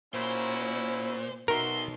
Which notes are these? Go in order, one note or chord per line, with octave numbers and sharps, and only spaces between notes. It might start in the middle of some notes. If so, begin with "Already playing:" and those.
A#2 C#4 E4 F#4 C5
B2 D#4 F#4 A#4 E5 C6